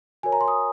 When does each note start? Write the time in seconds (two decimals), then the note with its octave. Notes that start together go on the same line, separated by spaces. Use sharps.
0.23 F#4 A#4 C#5 G#5
0.32 A#5
0.41 C6
0.48 D#6